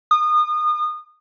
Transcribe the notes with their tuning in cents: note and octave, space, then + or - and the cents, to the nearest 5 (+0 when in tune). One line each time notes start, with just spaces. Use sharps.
D#6 -30